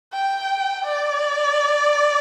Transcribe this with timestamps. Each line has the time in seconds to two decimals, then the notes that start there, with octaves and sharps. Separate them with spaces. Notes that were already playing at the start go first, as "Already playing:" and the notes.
0.13 G5
0.85 D5